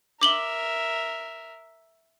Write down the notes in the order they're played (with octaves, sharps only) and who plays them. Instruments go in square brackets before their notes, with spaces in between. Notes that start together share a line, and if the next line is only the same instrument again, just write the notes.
[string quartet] A#4 E5 [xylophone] D6 F#7 G7